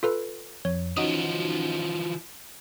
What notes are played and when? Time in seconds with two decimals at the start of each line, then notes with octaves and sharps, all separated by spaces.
0.03 F4 A4 B4
0.65 F2 C#5
0.97 E3 F3 C#4 D#4 F#4 D#6